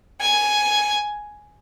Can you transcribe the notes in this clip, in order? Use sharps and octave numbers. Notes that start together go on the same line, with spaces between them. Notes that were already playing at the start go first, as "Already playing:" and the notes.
G#5